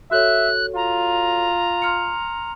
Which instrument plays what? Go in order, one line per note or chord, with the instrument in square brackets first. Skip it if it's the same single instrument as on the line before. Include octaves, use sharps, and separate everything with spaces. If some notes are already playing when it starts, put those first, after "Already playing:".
[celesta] F#4 A4 C#5 [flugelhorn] E5 [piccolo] F#6
[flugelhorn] F4 [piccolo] A#5
[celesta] C6 F6 C#7